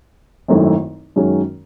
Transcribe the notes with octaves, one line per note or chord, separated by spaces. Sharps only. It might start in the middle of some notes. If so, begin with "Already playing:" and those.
G#1 F#2 D#3 A3 E4
F#2 D#3 G#3 C#4 F#4